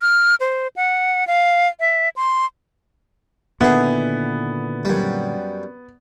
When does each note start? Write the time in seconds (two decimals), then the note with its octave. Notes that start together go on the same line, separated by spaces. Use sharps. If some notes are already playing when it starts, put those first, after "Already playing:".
0.02 F6
0.40 C5
0.76 F#5
1.27 F5
1.80 E5
2.16 C6
3.61 A#2 D3 D#3 B3 E4 G#4
4.85 F#2 G3